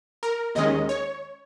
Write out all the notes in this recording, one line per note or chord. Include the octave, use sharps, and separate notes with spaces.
A#4
D#2 D#3 G#3 C#4 D#5
C#5